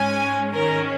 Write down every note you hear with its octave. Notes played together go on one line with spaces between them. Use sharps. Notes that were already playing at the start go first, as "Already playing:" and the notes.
Already playing: G#2 G#3 C#4 G#5
G#2 D#3 C#4 A#4